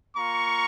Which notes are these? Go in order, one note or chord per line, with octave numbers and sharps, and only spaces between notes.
A#3 F4 A#5 C#6